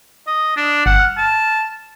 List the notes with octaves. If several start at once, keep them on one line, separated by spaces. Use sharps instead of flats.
D#5
D4
G1 F#5
F6
A5